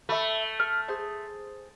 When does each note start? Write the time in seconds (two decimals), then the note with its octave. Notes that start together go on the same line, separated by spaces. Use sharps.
0.09 A3 E5 B5
0.60 F6
0.88 G#4 C5